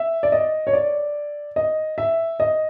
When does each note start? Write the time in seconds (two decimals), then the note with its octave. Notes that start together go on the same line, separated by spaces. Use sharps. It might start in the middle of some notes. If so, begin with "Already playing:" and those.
Already playing: E5
0.23 D5
0.32 D#5
0.67 C#5
0.73 D5
1.56 D#5
1.98 E5
2.40 D#5